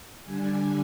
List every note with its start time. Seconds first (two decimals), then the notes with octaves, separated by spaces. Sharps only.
0.24 D3 G3 D4 G#5